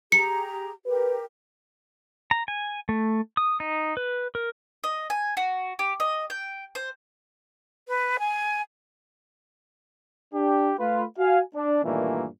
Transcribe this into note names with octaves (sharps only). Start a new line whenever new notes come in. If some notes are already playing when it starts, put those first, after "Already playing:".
G4 G#4 A#5 C#7
G4 A#4 B4
A#5
G#5
A3
D#6
D#4
B4
A#4
D#5
G#5
F#4
G4
D#5
G5
C5
B4
G#5
D4 G4
A3 F4 B4
F#4 F5 G#5
D4
G2 A#2 D#3 E3 A3 A#3